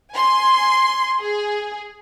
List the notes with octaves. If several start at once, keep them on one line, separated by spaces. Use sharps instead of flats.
G#5 C6
G#4